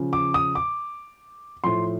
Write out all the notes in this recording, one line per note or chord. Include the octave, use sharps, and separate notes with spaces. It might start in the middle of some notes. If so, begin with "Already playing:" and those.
Already playing: C#3 F3
D6
D#6
D6
A2 F3 C6